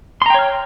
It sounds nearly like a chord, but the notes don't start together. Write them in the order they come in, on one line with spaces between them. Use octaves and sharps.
C6 A#5 G5 C#5 F6